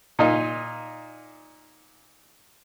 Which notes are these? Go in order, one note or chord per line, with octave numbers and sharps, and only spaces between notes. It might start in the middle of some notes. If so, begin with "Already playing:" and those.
A#2 D#4